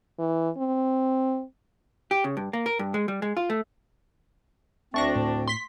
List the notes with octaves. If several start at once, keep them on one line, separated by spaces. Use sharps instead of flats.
E3
C4
G4
C#3
G2
A#3
A#4
G2
G#3
G3
G#3
F4
A3
D2 A3 C4 D4 C#6 A#6
A2
C6 B6